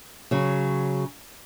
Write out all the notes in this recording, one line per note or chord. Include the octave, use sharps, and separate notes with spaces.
C#3 F#3